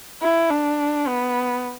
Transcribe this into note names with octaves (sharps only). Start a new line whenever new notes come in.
E4
D4
B3